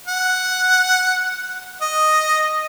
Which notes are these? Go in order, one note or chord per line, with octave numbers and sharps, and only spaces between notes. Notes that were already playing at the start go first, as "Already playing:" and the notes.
F#5
D#5